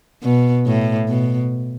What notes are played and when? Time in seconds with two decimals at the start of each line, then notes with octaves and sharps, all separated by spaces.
0.23 B2
0.66 A2
1.09 B2